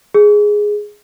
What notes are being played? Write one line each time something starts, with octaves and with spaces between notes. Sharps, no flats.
G#4